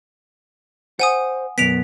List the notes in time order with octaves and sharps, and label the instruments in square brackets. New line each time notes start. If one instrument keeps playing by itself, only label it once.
[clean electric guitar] C5 [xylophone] F#5 G#5 D#6
[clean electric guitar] F#2 B2 B3 [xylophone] B6 D7 F7